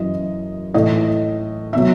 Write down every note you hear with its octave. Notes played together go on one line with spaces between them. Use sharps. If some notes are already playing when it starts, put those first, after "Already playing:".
Already playing: F#2 E3 D#5
A2 E3 D#5
B2 F#3 E5